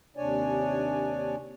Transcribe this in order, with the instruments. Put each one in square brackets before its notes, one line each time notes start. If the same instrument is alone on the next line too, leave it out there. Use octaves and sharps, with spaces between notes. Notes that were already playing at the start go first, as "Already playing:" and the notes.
[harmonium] D#2 C3 D4 C#5 D5 G#5